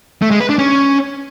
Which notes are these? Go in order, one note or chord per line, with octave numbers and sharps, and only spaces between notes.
A3
G#3
B4
D4
C#4